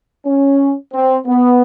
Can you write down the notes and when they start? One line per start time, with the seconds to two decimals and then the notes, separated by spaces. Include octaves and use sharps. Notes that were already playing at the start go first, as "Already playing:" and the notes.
0.26 C#4
0.93 C4
1.27 B3